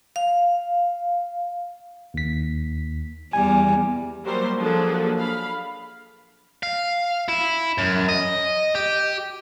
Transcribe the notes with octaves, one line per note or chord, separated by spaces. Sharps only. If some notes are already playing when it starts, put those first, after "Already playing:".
F5
D#2 B6
E2 G3 G#5
F#3 G3 A#3 C5 C6
F3 F#3 A#3 D4 G#4 A4
F5 B5
F5
E4
F#2
D#5
G4